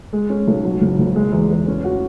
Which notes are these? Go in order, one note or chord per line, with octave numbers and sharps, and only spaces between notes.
G#3
C#4
B1
F#3
F#1
F#1
G#3
E2
E2
C#4
F#4